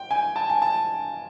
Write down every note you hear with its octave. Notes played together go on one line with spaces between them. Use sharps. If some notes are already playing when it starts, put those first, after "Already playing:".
Already playing: G5
G#5
A5
G#5
A5